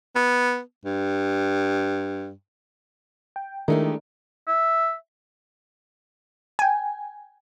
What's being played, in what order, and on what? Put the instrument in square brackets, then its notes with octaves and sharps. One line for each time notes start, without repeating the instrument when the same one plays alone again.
[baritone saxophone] B3
G2
[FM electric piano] G5
[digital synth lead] D#3 [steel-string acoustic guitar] G#3 A3 G4 [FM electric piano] D4 E4 A#4
[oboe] E5
[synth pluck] G5 G#5